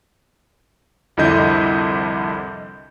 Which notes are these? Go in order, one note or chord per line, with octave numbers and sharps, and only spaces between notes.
C2 F2 D3 E4 D#5 G6